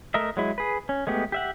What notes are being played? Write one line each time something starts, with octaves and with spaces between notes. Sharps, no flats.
A3 A#4 D#5 E5
F#3 G#3 E4
G#4 B4
C#4
G#3 A3 B3 G4
G4 E5 F#5